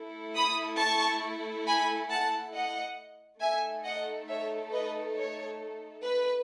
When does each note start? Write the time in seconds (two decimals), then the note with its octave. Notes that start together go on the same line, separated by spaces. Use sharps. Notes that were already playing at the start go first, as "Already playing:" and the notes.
Already playing: A3 E4 A4
0.36 B5 D#6
0.79 A5 C#6
1.67 G#5 B5
2.10 F#5 A5
2.54 D#5 F#5
3.41 A3 D#4 A4 E5 G#5
3.84 D#5 F#5
4.28 C#5 E5
4.72 B4 D#5
5.16 C#5
6.03 B4